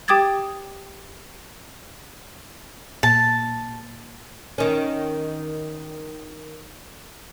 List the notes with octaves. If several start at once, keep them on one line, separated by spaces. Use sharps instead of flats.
G4 G5 D6 D#6 G#6 A6
A#2 A5
D#3 C#4